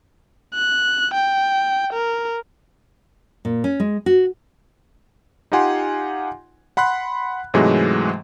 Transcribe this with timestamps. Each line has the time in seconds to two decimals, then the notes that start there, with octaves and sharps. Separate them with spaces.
0.55 F#6
1.14 G5
1.93 A#4
3.45 A#2
3.64 C#4
3.80 G#3
4.06 F#4
5.52 D#4 F4 G4 F#5 G#5 C6
6.77 F#5 B5 C6 F#6
7.54 G#2 C3 E3 F#3 G#3 A3